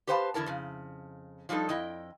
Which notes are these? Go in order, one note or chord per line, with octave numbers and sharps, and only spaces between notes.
G4 B4 C5 F5 G5 A5
E2 D3 E4 A#4 A5
F2 C#3
F3 G3 D4 D#4 A4
F2 E4 D#5 G5